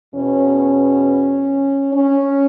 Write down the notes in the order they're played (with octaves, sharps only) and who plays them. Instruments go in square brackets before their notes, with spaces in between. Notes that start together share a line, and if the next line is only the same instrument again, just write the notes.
[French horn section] E2 B2 C#4
C#4